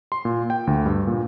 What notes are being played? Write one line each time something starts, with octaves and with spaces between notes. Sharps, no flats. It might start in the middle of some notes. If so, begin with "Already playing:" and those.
C6
A#2
G5
D2
G2
A#2